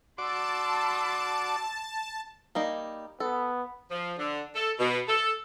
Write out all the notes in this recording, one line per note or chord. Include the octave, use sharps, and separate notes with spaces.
F#4 D5 A5 C6 D6 E6
G3 A#3 D#4
B3 A4
F3
D3
A4
B2
A4